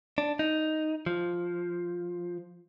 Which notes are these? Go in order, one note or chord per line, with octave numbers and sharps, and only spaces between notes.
D4
D#4
F3